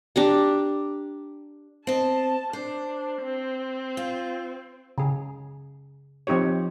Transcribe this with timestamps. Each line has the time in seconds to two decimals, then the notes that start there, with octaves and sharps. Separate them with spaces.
0.16 D4 G4 A#5
1.87 C4 D#5 A5
2.53 D4 C5
3.22 C4
3.97 F4
4.98 C#3 G#4
6.27 F3 C4 D#4 G4 C#5